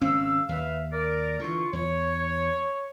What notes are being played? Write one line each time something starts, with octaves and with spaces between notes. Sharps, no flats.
G#1 C#3 C4 C#4 F5 E6
D#2 B4 E5 F5
A#4 D5
D3 E3 F4 C#6
E2 C#5